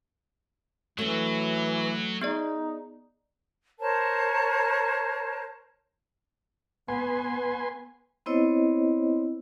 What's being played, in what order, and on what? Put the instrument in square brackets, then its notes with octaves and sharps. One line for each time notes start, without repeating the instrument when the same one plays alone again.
[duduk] E3 [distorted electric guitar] F#3 [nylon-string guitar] A3 C#4
[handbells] B3 G#4 D5 [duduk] D#4
[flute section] A#4 C5 C#5 A5
[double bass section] B3 [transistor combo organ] B4 G#5 C6
[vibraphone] B3 C4 E4 C5 C#5 D#5